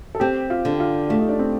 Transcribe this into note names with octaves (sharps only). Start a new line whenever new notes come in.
A4
C4 G4
F4
D3
F4
A3 F4
D#4
D4
C4